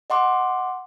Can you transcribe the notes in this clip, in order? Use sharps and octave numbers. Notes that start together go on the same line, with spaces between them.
D#5 F#5 C6 D6